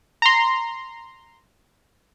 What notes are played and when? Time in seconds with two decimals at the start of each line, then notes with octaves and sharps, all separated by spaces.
0.22 A#5 C6